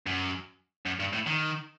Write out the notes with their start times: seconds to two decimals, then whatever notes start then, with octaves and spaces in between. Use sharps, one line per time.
0.07 F#2
0.86 F#2
1.00 G2
1.13 A2
1.27 D#3